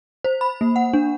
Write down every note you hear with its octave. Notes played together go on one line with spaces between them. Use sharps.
C5
B5
A#3
F#5
D4